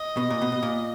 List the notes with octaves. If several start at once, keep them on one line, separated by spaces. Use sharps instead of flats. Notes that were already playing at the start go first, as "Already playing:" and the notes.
Already playing: D#5
B2
A#2
B2
B2
A#2